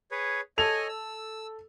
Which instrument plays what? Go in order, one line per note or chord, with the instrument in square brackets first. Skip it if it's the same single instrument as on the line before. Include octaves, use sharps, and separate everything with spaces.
[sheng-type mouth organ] G#4 B4 C#5
[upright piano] A4 F7 [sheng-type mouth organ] C#5 D#5 G#5
[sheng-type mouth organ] E6